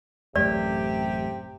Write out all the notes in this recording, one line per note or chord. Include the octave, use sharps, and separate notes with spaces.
A1 F#2 C3 A3 G4 D5